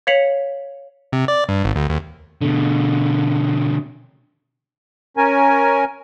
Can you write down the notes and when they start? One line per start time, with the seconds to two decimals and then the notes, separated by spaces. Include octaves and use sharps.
0.07 C#5 F5 B6 C#7 F7 F#7
1.13 C3
1.28 D5
1.49 G2
1.64 G#1
1.76 D2
1.89 D#2
2.42 B2 D3
5.17 C#4 A#4 G#5